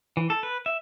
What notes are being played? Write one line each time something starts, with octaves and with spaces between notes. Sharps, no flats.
E3
A4
B4
E5